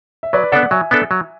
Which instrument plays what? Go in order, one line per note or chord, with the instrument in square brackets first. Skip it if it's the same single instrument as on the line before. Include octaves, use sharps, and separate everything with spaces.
[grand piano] E5
[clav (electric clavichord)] F#3 [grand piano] B4 D5
[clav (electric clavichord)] B3 D4 A4 [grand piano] D5 F#5
[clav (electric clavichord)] F#3 [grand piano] E5 G#5
[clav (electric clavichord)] B3 D4 A4
F#3